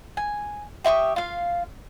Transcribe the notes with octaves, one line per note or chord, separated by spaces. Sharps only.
G#5
G4 E5 C#6 D#6
F4 F5